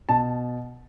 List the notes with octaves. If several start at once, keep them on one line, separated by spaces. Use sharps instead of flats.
B2 A5